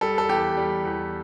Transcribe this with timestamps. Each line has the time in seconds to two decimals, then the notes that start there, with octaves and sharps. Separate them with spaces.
0.01 G3 A4
0.18 A4
0.29 E2 G4
0.57 G3
0.85 E2